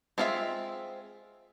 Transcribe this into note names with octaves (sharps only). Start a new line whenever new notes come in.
G#3 C4 F4 A4 E5